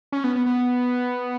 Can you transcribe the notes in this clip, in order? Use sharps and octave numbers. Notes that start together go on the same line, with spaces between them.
C#4
B3
B3
B3